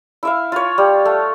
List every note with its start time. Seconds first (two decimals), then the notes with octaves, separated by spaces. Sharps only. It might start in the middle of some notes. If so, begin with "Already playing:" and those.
0.23 E4 E5 F5
0.52 F4 C#5
0.78 G3
1.05 A3